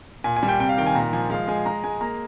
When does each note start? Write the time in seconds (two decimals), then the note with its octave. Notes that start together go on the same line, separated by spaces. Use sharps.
0.24 A#2 G#5
0.36 G#5
0.43 G3
0.48 G5
0.60 C3 G5
0.69 F5
0.78 D#3 G5
0.86 G#5
0.95 A#2 A#5
1.13 F3 G#5
1.30 G#3 F5
1.48 G#3 G#5
1.66 G#3 A#5
1.84 G#3 G#5
2.01 A#3 A#5